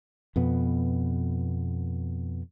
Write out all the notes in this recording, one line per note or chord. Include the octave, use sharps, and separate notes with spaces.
F2 B2 B3